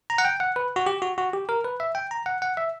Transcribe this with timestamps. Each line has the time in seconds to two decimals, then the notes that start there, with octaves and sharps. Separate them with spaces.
0.10 A#5
0.18 F#5
0.25 G5
0.40 F#5
0.56 B4
0.76 F#4
0.86 G4
1.02 F#4
1.18 F#4
1.33 G4
1.49 A#4
1.64 B4
1.80 E5
1.95 G5
2.11 A#5
2.26 F#5
2.42 F#5
2.57 E5